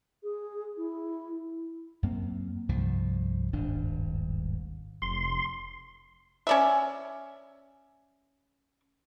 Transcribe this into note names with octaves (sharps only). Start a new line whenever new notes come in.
G#4
E4
F#2 A#3 C4
C2 G2 F3
D#1 G#1 G2 D4
F1 C6
C#4 D5 E5